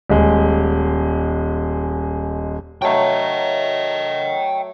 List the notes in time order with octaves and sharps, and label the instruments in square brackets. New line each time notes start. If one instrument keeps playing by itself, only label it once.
[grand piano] D#1 G#3
[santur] F#3 A3 A#5 [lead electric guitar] D#5 G5